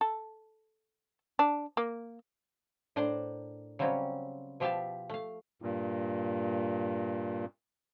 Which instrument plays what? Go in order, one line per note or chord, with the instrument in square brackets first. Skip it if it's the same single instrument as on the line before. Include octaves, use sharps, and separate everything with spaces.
[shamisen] A4
D4
A#3
[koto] A2 D4 A#4 C5 D5
C#3 F#3 G3 C4 C#4
B2 F3 G4 E5 F5 A5
A3 F5
[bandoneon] G2 A#2